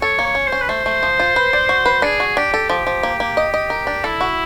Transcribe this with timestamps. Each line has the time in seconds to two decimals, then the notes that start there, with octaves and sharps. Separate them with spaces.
0.02 A4 C#5
0.19 A#3
0.24 C#5
0.35 C#4
0.47 C5
0.52 C#4
0.62 B4
0.69 A3 C5
0.86 A3
1.03 F3
1.20 F4
1.36 B4
1.53 D5
1.69 F#4
1.86 B4
2.02 D4 G#4
2.20 F#4
2.37 D4 G4
2.54 A4
2.69 F3 G4
2.87 F3
3.03 A#3
3.20 A#3
3.37 D#5
3.54 D#5
3.70 A#4
3.87 D4
4.04 E4 A4
4.21 F#4